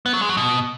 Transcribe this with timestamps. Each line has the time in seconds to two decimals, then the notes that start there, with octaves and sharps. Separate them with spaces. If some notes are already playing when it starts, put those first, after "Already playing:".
0.06 B3
0.13 F#3
0.21 G#3
0.29 F#3
0.37 B2